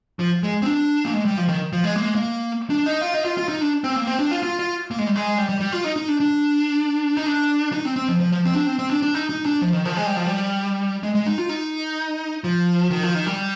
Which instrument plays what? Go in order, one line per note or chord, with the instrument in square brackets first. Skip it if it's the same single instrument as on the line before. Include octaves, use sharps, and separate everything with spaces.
[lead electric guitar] F3
G#3
C4
D4
A#3
G#3
G3
F3
D#3
F3
G#3
A#3
G#3
A#3
D4
D#4
F4
D#4
F4
F4
D#4
D4
C4
A#3
C4
D4
F4
F4
F4
A#3
G#3
G3
G#3
G3
G3
G3
F4
D#4
D#4
D4
D4
D#4
D4
D#4
C4
C4
F3
F3
F3
C4
D4
C4
C4
D4
D4
D#4
D#4
D4
F3
D#3
F3
G#3
G3
F3
G3
G#3
G#3
D#4
F4
D#4
F3
D#3
F3
D#3
G3